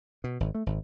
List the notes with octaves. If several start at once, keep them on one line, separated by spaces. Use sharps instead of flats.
B2
G#1
A3
G#1